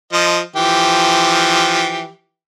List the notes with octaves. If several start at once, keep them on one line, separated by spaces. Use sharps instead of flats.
F3 D#5
E3 F3 G4